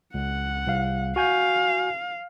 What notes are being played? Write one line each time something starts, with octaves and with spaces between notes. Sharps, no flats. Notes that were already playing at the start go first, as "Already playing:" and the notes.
C#2 F#5
C2 F5
F#4 F5 G#5 G6